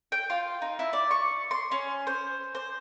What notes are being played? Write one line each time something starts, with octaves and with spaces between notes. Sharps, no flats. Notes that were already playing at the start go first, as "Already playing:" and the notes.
G5
F4
D#4
E4
D5
C#6
C6
C#4
C5
C5